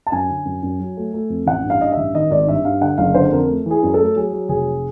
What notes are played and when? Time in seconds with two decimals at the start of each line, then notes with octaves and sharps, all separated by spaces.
0.07 A5
0.12 F#2 G#5
0.29 D3
0.45 F#2
0.63 F#2
0.79 F#3
0.97 A3
1.14 A3
1.30 F2
1.47 A1 F#5
1.64 G2
1.70 F5
1.81 G2 D#5
1.92 A1 E5
2.15 D#3 D#5
2.31 G#1 D5
2.47 G2 E5
2.64 G2 F5
2.81 D3 F#5
2.98 F#1 F5
3.15 D3 C5
3.31 F2 A#4
3.48 A3
3.66 E3 G#4
3.83 F#2
3.94 A4
3.99 A3
4.16 F#3 G#4
4.33 F#3
4.49 F1 G#4